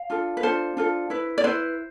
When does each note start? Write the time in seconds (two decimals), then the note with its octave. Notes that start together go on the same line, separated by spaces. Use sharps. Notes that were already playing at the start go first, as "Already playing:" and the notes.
Already playing: F5
0.10 D4 F4 A4
0.37 B4
0.43 D4 F4 A4 C5
0.77 D4 F4 A4
1.10 E4 B4
1.38 D5
1.44 E4 B4 C5